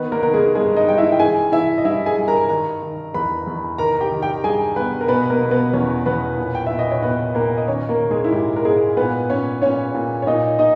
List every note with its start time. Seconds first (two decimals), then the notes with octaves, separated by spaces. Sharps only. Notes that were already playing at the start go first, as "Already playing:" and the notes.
Already playing: D#3 B3 B4
0.12 A#3 A#4
0.23 D#3 A#4
0.34 G#3 G#4
0.55 G2 G#3 G#4
0.76 D#4 D#5
0.88 G2 G5
0.98 E4 E5
1.12 G5
1.19 E3 G#4 G#5
1.52 E3 E4 E5
1.78 D#5
1.84 G2 E4 E5
2.06 G#4 G#5
2.17 G2
2.28 A#4 A#5
2.49 D#3 A#4 A#5
2.82 D#3
3.14 E2 B4 B5
3.47 E2
3.78 D#3 A#4 A#5
4.01 G4 G5
4.11 D#3
4.22 G4 G5
4.44 G2 G#4 G#5
4.76 G2 B3 B4
5.01 A#4
5.08 B2 B3 B4
5.30 A#3 A#4
5.41 B2
5.51 B3 B4
5.73 E2 C#4 C#5
6.06 E2 B3 B4
6.38 A#2
6.55 G5
6.67 A#2 E5
6.79 D#5
6.91 C#5
7.02 A#2 B3 B4
7.35 A#2 A#3 A#4
7.58 D#5
7.68 D#3 C#4 C#5
7.89 A#3 A#4
8.00 D#3
8.11 G#3 G#4
8.24 E4
8.32 G#2 G4
8.56 A#4
8.65 G#2 G#3 G#4
8.97 A#2 B3 B4
9.30 A#2 C#4 C#5
9.62 A#2 C#4 C#5
9.94 A#2
10.22 C#5
10.27 A#2 D#4 D#5
10.59 A#2 D#4 D#5